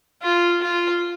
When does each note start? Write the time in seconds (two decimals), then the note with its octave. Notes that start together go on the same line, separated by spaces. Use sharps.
0.22 F4
0.62 F4